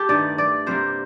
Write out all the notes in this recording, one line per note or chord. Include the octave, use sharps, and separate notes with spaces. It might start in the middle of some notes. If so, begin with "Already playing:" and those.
Already playing: G4 A4
G2 D#3 A3 D5
D5
C3 G3 A#3 C5